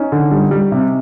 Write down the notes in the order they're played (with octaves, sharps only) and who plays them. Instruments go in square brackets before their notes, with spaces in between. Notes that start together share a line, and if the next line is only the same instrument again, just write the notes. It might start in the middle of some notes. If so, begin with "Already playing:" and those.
Already playing: [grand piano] C#4 D#4
D3
G3
G3
C3